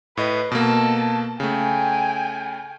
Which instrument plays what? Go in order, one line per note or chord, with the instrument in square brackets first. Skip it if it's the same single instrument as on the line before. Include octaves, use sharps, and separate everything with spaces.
[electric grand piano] A2 D#5 [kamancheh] B4
[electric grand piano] B2 A#3 [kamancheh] A4 A5
[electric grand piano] C#3 A3 [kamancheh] G5 G#5